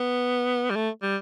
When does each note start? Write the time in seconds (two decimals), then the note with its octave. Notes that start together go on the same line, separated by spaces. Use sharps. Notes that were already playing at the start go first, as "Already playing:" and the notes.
Already playing: B3
0.70 G3
0.76 A3
1.02 G3